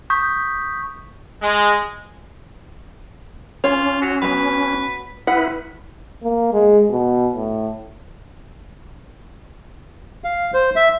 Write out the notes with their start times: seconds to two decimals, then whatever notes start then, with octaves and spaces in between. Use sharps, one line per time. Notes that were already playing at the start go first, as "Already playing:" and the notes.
0.10 C#6 D#6 G6 B6
1.41 G#3
3.64 C#4 F4 C#5
4.02 F#3
4.22 F#3 B3 B4
5.27 B3 E4 B4 F#5
6.24 A#3
6.53 G#3
6.90 B2
7.35 A2
10.24 F5
10.54 C5
10.76 E5